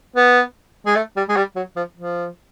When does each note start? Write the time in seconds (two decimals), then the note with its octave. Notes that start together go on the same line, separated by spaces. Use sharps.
0.16 B3
0.86 G#3
0.96 A3
1.17 G3
1.29 G#3
1.36 G3
1.56 F#3
1.76 F3
1.97 F3